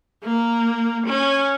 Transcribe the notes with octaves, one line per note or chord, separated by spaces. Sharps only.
A#3
C#4